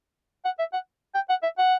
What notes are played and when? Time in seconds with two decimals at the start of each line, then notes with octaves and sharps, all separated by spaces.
0.45 F#5
0.59 E5
0.73 F#5
1.15 G5
1.30 F#5
1.43 E5
1.58 F#5